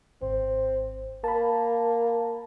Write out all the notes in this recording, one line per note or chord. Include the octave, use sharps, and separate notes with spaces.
G#1 C4
A#3 A5 B5